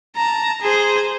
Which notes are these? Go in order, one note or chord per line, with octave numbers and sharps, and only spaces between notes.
A5 A#5
G#4 C5